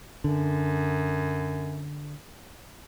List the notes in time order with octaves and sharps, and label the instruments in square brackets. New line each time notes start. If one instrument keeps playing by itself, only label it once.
[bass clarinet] F#2 [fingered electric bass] D3